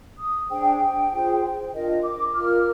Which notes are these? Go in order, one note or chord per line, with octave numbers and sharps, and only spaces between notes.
D#6
D4 G#4 C5 G5
F4 G#4 C5
D4 F4 A#4 D#5
D6
F4 A#4 F6